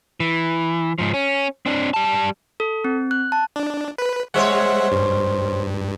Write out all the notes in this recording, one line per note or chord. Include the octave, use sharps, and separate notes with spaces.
E3
G#2 F3
C#4
C4 D4
G3 A5
A4
C4
F#6
A5
D4
B4
G3 G#3 C5 C#5 E5 F#5
G2